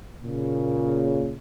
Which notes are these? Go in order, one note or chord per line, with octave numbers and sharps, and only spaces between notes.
A#2 C#3